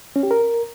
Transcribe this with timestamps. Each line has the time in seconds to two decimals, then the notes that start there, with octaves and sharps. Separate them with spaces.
0.16 C#4
0.23 G4
0.31 A#4